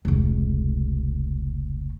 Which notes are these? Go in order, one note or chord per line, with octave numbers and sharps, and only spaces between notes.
F1 C#2